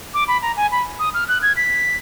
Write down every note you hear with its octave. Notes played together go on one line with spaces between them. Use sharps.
D6
B5
A#5
G#5
B5
D#6
F6
F#6
G#6
B6